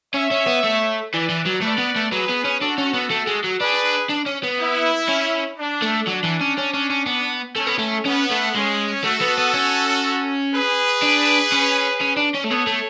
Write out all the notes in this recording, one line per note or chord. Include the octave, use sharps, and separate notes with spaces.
C#4 C#5 E5
C#4
B3
A3
E3 B4 D5
E3
F#3
A3 B4 D5
B3
A3
F#3 G#4 B4
B3
C#4
D4 F#4 A4
C#4
B3
A3
G#3
F#3
D4 G#4 B4
D4
C#4
B3
E4
C#4
D4
A3
F#3 D4
E3
C#4
C#4
C#4
C#4
B3
A3 C#4
B3
A3
B3 C#4
A3
G#3 C#4
A3 F#4 A4
B3
B3
C#4
G#4 B4
D4
C#4
C#4
D4
C#4
A3
B3 A4 C#5
A3